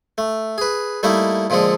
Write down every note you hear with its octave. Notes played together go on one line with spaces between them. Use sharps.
A3
G#4 B4
G3 A3 A#3 D#4 E4 A4
A#2 D3 F3 G#3 A4